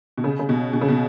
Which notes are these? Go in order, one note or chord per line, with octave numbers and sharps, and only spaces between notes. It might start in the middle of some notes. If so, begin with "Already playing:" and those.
B2
C#3
C#3
B2
B2
C#3
B2